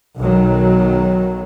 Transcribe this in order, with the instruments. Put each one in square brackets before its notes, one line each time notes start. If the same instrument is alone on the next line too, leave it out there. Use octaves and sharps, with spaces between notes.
[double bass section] B1 D#3 F#3